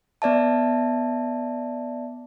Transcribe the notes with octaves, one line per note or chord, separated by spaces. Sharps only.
B3 D5 E5 A5